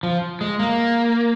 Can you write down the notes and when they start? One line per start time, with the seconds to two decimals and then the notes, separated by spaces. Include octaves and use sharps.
0.03 F3
0.41 G#3
0.59 A#3